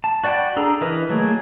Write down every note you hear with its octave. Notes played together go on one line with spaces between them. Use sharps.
A5
F#4 D5 F#5 G5 B5
D4 G#4 A4 A#5
E3 A#4 B4 D#5
F#3 A3 A#3 G#4